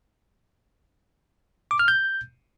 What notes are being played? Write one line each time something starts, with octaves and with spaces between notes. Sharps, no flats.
D6
F6
G6